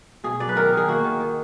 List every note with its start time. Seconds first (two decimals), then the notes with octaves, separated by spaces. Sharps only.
0.24 B2 G#4
0.40 F#3 D5
0.49 B4
0.56 D#3 A#4
0.73 D#3 G#4
0.88 A#3 F#4
1.04 D#3
1.20 D#3